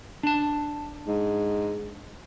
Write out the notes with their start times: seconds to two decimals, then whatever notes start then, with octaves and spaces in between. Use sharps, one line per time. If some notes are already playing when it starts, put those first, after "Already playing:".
0.23 D4 A5
1.07 G#2